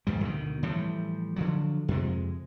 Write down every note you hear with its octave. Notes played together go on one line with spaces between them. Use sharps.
D#2 G#2 G3
D2 B2 D#3
A2 E3 F3 G3
D3 F3 F#3
F2 C3 G#3